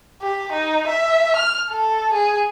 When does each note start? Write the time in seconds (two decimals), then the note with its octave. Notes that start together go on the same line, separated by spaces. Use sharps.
0.22 G4
0.53 D#4
0.88 E5
1.36 F6
1.70 A4
2.14 G#4